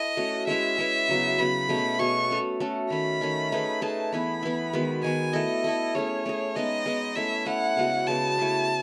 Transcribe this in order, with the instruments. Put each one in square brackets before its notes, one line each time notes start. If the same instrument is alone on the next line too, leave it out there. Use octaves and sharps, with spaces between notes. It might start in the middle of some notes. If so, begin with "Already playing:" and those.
Already playing: [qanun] E4 A4 [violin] D#5
[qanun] A3 C#4 F#4
[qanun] G#3 C#4 E4 B4 [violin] E5
[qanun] G#3 C#4 E4 B4
C#3 F#3 B3
[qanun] C#3 F#3 B3 [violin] B5
[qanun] B2 A3 C#4 G#4
[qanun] B2 A3 C#4 G#4 [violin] C#6
[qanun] A3 C#4 F#4 A4
A3 C#4 F#4 A4
[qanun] D#3 A3 C#4 [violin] B5
[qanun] D#3 A3 C#4
A3 D#4 G#4 B4
[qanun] A3 D#4 G#4 B4 [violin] A5
[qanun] E3 B3 E4 [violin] B5
[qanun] E3 B3 E4
D#3 G#3 B3 F#4
[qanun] D#3 G#3 B3 F#4 [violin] G#5
[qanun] A3 E4 A4 [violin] D#5
[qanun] A3 E4 A4
[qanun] A3 C#4 G#4 [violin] C#5
[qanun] A3 C#4 G#4
[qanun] G#3 B3 D#4 [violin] D#5
[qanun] G#3 B3 D#4
[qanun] A3 C#4 E4 [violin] E5
[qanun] A3 C#4 E4 [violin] F#5
[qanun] C#3 G#3 B3 F#4
[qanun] C#3 G#3 B3 F#4 [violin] A5
[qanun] A3 E4 G#4 B4